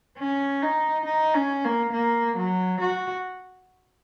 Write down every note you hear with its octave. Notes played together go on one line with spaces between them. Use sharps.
C#4
D#4
D#4
C#4
A#3
A#3
F#3
F#4